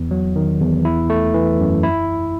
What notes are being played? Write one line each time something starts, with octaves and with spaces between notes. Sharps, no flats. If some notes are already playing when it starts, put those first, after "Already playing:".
Already playing: E2
F#3
D#3
E2
E4
A3
E3
F#2
E4